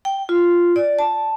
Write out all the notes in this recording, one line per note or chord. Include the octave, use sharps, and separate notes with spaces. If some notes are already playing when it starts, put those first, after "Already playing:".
G5
F4
D5
A5